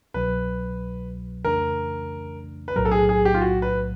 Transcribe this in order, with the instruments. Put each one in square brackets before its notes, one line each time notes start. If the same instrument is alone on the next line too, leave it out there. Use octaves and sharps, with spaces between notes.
[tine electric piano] C2 B2 F#3 [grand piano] B4
[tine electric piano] F2 C#3 E3 A3 D4 [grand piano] A#4
[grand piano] B4
[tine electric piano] B1 A2 F#3 [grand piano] A#4
[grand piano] A4
G#4
G#4
G4
F4
F#4
B4